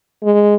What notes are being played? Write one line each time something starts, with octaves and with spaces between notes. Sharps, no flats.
G#3